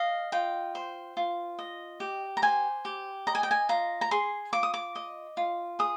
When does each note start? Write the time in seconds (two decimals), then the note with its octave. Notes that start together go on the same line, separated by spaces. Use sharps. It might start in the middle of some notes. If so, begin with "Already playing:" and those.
Already playing: D#5 F5
0.32 F4 G5
0.75 C5
1.17 F4
1.59 D#5
2.00 G4
2.37 A#5
2.42 C5 G#5
2.85 G4
3.27 D#5 A#5
3.35 G#5
3.43 G5
3.51 G#5
3.69 F4 A#5
4.01 A#5
4.11 G#4 C6
4.53 F4 D6
4.63 D#6
4.74 D6
4.96 D#5
5.37 F4
5.79 G#4 D#6